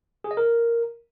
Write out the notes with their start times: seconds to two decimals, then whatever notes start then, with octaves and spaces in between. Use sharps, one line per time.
0.24 G#4
0.31 D#5
0.37 A#4